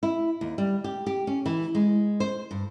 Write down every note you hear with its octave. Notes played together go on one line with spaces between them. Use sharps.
E4
D#2
G3
G4
G4
C#4
E3
G#3
C5
G2